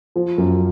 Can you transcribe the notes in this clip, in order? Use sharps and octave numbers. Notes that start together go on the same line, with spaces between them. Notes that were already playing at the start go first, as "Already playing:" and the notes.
F3
F#2